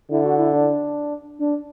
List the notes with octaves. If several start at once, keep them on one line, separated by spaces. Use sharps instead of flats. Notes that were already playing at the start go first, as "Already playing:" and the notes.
D3 E4
F#4
E4
D4
D4